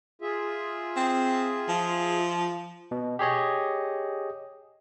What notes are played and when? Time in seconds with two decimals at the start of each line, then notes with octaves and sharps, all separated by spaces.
0.22 F4 G#4 E5
0.97 C4
1.69 F3
2.91 B2
3.19 G4 G#4 C#5 D#5